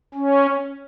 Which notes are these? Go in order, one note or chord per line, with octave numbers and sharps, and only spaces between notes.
C#4